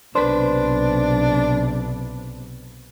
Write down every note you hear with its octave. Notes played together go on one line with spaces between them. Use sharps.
B1 C3 D4 B4 C5